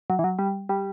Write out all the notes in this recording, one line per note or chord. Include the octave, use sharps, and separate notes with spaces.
F#3
E3
F#3
G3
G3